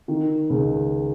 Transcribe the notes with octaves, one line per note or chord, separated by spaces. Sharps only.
D#3
C#2